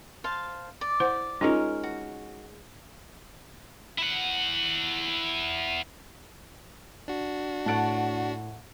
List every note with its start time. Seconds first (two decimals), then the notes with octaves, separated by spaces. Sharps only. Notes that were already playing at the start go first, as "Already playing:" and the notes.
0.24 C5 F5 A5
0.81 D5
1.00 E4 C5 F#5
1.41 G#3 C#4 D#4 F4 A#4
1.83 F#4
3.98 E4 F#5
7.08 D4 F#4
7.66 A2 C#5 F#5 A5 D7